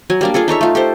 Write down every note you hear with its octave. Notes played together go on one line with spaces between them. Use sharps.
F#3 G#5
G3 A#3 D4
D4 F4 G#4 A4
D#4 A4 C#5 E5
A3 F4
G4 A4 C5